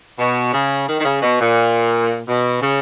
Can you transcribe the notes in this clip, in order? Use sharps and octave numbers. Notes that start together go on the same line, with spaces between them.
B2
C#3
D#3
D#3
C#3
B2
A#2
B2
C#3